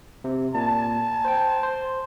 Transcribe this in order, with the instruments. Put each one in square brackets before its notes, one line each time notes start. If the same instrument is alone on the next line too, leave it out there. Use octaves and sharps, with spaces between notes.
[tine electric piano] C3
[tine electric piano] A#2 [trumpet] A5
[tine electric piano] C5 G5
C5